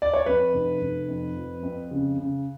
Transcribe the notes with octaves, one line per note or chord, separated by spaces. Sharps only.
D5
C#5
F2 B4
F1
F1
F2
F3
F2
C#3
C#3